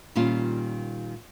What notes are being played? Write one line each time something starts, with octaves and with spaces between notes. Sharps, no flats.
A#2 D#3 G3 C#4 F4